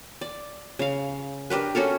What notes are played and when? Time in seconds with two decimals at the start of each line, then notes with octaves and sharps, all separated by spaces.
0.21 D5
0.79 C#3 F5
1.50 D4 G4 A#4 B4
1.75 C#4 F#4 A4 A#4